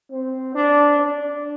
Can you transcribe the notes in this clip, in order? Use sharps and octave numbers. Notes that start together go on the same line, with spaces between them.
C4
D4
D4